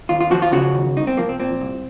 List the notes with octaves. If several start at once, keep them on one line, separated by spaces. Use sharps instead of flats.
D#2 F4
F4
F3 F#4
F4
C#3 F#4
D#2
C2 D#4
C4
F3 A#3
C4
A#2 C4
C2